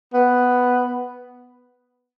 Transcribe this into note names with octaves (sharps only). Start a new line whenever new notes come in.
B3